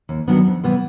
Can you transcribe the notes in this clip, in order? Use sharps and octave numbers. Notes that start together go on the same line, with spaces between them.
D#2
D#3 F#3 B3 D4
F2
C3 E3 G3 B3